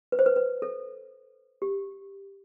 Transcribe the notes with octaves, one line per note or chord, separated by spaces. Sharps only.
B4
C5
B4
B4
A4
G4